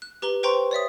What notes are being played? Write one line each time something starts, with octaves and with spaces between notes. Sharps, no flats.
F#6
G4 B4 A#5 G7
B4 C5 G5 A#5 C6 C#6
C#5 D5 E5 D#6